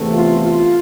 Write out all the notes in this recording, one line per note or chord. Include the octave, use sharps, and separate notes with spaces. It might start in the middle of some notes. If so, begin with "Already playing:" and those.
Already playing: E2 C3 E3 A3
F4
F4